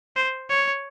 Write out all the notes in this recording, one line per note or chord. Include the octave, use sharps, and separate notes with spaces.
C5
C#5